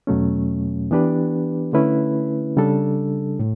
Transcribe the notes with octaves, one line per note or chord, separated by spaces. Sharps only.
E2 B2 F#3 A3 C#4
E3 B3 D4 G4 B4
D3 A3 C#4 E4 B4
C#3 G3 D4 A4
A2